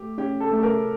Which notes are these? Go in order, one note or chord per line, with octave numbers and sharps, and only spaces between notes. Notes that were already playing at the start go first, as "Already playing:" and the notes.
Already playing: A3 G4
C#4 G4
A4
A3
A4
A#4